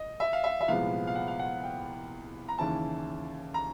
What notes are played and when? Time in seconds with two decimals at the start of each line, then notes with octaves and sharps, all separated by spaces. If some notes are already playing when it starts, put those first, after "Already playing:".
Already playing: D#5
0.20 E5
0.33 F5
0.44 E5
0.61 E5
0.68 C2 A#2 F3 G#3 B3 F5
1.07 F5
1.16 F#5
1.28 F5
1.39 F#5
1.63 G5
2.48 A#5
2.58 D#2 C#3 E3 A5
3.54 A#5